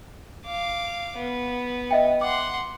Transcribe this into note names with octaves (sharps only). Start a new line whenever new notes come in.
F5 D6
B3
D#5 E5 G5
F#5 C6 D6